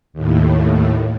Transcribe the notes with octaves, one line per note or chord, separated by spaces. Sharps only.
D#2 A2